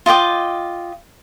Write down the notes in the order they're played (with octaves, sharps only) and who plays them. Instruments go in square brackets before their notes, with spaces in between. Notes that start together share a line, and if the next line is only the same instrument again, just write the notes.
[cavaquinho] F4 D#5 G5 D6